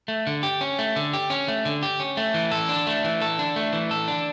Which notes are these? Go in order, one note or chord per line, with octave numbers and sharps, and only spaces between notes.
A3
D3
G4
C#4
A3
D3
G4
C#4
A3
D3
G4
C#4
A3
E3
A4
D4
A3
E3
A4
D4
A3
E3
A4
D4